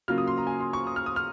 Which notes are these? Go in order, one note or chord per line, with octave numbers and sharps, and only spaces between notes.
C#3 F#3 A#3 F4 F6
D#6
C6
A#5
G#5
C6
C#6
D#6
F6
D#6
F6